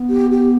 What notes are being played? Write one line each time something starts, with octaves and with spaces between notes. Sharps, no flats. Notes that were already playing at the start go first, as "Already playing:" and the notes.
Already playing: B3
G4
G4